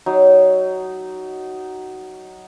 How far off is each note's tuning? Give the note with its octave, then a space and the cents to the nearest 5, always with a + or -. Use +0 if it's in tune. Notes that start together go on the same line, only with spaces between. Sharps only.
F#3 +15 D#4 +0